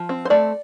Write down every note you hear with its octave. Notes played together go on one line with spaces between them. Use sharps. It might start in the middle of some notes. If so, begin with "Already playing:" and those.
Already playing: F3
C4
C5
A3 D5